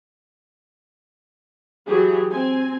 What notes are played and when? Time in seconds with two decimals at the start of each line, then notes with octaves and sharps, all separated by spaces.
1.86 E3 F#3 G4 G#4
2.30 C4 G#5